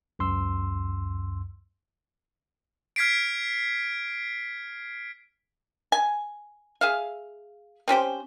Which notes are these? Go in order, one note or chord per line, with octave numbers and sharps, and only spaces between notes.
C#2 F#2 C6 E6
F6 G#6 B6 C7 D7
G#5
G#4 E5 F5
C4 C#4 G4 C5